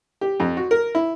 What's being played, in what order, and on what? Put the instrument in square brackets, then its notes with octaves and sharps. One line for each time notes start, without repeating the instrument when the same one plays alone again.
[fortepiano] G4
F2
F#4
A#4
E4